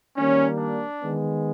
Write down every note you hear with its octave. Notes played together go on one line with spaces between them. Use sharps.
D#3 G3 A#3 C#4
D4
D#3 G#3 B3